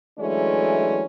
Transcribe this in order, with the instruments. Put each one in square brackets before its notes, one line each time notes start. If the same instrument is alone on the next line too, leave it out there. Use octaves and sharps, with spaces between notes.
[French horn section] E3 F#3 G#3 A3 C#4 D4